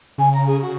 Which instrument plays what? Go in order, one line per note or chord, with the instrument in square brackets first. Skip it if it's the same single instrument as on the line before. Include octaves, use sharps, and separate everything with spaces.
[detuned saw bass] C#3 [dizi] G#5
[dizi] A#5
G#4
F#4